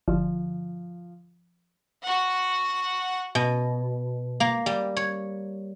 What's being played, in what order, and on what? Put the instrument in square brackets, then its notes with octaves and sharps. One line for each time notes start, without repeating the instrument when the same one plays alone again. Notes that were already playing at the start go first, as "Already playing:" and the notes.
[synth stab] G1 [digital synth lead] F3
[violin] F#4 F#5
[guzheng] B2
A#3
G3
C#5